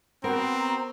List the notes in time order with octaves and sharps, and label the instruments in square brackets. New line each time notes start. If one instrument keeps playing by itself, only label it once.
[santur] B3 F#4 [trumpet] C4 [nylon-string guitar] A#4 [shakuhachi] A#5